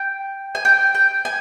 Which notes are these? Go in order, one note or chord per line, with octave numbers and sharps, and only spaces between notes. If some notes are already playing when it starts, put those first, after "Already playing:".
Already playing: G5
G#5
G5
G5
G#5